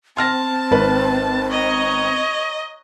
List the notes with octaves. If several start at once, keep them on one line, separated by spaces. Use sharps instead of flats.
C4 A5 C6 F6 A#6
G#1 B4
C#5 D#5 A#5